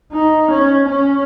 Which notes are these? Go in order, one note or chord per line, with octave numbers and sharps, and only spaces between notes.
D#4
C#4
C#4